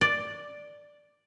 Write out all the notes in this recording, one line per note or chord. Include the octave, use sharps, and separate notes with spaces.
D5